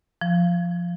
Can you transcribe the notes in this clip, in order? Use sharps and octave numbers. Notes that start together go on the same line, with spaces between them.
F3